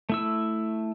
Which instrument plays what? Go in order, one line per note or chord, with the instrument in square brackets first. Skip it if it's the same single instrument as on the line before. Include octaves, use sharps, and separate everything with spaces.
[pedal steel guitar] A3 E4 E6